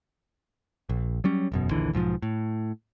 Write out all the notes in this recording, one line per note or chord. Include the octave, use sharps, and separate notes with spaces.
A#1
F#3 G3 C#4
E1 F#2 B2
A#1 D#2 D3 E3
B1 G#2 D#3 F3
A2